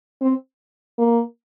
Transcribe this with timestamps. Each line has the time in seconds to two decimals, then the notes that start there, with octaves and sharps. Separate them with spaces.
0.21 C4
0.98 A#3